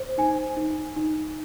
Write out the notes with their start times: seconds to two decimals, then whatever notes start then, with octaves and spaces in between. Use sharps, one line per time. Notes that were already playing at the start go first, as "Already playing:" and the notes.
Already playing: C5
0.18 D#4 G#5
0.57 D#4
0.96 D#4